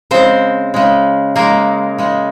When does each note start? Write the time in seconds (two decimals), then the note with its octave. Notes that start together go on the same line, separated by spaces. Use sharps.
0.11 C#3 G#3 C4 C5
0.74 C#3 G#3
1.36 C#3 G#3 A#3 A#4
1.98 C#3 G#3